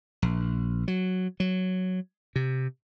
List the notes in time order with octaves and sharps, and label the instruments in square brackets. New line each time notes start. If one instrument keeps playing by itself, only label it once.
[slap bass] A#1
F#3
F#3
C3